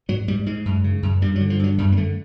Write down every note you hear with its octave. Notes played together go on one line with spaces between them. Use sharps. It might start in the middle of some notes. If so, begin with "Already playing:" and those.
G#2 F#3
G#2 G3
G#2 G#3
F#2
C#3
F#2
G2 G3
F#3
D3
F3
G2 F#3
F#2 G3
A#3
D3 A3